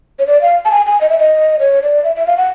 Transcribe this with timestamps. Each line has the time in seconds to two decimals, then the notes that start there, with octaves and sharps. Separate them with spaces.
0.19 C#5
0.27 D5
0.42 F5
0.65 A5
0.71 G#5
0.86 G#5
1.01 D#5
1.10 E5
1.19 D#5
1.60 C#5
1.83 D5
2.04 E5
2.16 E5
2.27 F5
2.37 F#5